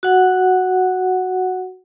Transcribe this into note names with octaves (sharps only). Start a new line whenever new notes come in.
F#4 F#5